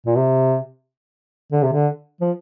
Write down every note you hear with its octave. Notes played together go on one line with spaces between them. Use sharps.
A#2
C3
D3
C3
D3
F3